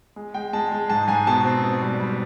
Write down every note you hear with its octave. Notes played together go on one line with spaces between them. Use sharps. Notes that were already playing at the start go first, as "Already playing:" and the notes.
G#3
G#3 G5
G#3 A5
G#3
G#2 A5
G#2 G#5
B2 A5
C4
B2
G3
G3